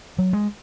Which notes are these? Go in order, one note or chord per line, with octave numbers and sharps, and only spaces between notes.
F#3
G#3